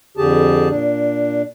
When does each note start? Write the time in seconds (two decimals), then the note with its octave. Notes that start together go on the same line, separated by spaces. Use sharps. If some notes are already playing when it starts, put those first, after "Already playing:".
0.17 F2 D3 G4 G#4 A5
0.69 A#2 D4